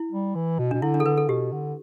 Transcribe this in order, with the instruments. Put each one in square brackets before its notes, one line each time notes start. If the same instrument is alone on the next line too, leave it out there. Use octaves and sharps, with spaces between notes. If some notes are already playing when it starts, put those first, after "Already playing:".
Already playing: [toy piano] E4
[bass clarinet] G3
E3
B2
[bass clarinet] B2 [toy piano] D4
[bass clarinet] D3 [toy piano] E4
[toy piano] D4
A4
[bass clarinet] D3 [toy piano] B4
[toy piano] A4
[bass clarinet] B2 [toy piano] G4
[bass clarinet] D3